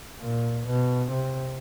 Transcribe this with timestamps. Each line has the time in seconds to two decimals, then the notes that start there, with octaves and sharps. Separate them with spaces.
0.21 A#2
0.67 B2
1.12 C3